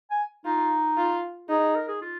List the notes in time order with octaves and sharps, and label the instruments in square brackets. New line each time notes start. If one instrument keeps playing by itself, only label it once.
[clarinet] G#5
[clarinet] D#4 [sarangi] F4
[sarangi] F4
[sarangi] D#4 [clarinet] G#4
[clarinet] A#4
G#4
F4